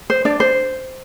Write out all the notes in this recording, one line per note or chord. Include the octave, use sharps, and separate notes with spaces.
C5
D4 D5
C5